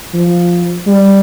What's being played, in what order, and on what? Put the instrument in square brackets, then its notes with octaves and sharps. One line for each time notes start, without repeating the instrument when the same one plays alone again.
[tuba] F3
G3